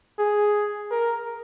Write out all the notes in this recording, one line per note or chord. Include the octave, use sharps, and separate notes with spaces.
G#4
A#4